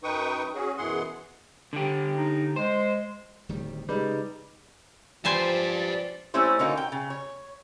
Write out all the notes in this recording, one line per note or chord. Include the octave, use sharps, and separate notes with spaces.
F#2 D#4 B4 G5 C#6 D#6
C#4 F#4 G#4
F#2 B2 E3 G#4 F#5 C6
D3 G4
D#4
G#3 C5
D1 D#3 G3
C#3 G3 G#3 D#4 G#4 B4
F3 G4 B4 C5 D5 G#5 A5
G3 A3 C4 C#4 E4 C5
D3 A#3 C#4 D#4 F#4
G5
C#3
C#5